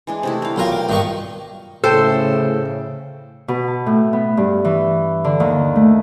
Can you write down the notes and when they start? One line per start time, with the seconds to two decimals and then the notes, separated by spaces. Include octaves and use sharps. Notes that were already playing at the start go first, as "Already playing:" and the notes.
0.07 E3 G#3 D4
0.23 C3 A3 E4
0.42 G3 F5
0.56 B1 F4 A#4
0.72 D6
0.89 G2 D#3 F4 A#4 C#6
1.84 A2 C#3 A4 C5 G5
3.48 B2
3.68 A5
3.86 A2
4.13 B3
4.37 G2
4.65 E3
5.24 D3
5.40 D#2
5.76 A3